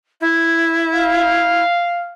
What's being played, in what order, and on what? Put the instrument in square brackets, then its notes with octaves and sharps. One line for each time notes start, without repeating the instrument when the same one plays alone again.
[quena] E4
[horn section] F5